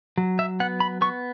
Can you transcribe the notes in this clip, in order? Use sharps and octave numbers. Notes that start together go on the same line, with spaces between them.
F#3
E5
B3 F#5
B5
B3 C#6